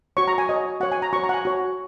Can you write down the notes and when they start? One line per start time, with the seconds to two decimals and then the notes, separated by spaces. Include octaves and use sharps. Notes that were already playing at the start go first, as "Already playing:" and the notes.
0.17 F#4 C#5 C#6
0.27 A#5
0.38 G#5
0.49 F#4 C#5 D#5
0.80 F#4 C#5 F#5
0.92 G#5
1.02 A#5
1.13 F#4 C#5 C#6
1.24 A#5
1.29 F#5
1.34 G#5
1.45 F#4 C#5